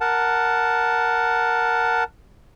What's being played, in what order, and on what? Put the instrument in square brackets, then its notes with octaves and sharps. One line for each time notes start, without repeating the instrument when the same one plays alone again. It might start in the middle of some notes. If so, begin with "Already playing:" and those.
[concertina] A#4 F#5 A5